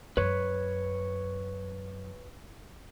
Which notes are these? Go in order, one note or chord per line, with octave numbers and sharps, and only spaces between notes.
F#2 B4 C#5